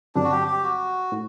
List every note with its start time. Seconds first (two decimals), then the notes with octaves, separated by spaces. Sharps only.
0.15 G2 D3 F#3 C4 D4
0.24 F#4
0.32 G4
0.48 G4
0.63 F#4
1.12 A2